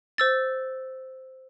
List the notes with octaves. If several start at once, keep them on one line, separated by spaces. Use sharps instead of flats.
C5 E6 A6